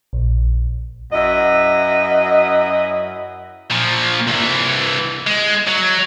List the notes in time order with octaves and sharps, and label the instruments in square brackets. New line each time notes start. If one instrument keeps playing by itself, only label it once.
[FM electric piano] A#1
[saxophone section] F#2 E4 D#5
[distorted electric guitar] A#2 F3
C2 E3
G#3
F#3